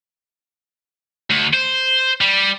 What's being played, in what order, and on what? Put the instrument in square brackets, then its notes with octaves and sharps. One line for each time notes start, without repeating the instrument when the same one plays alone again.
[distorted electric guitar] D2
C5
G3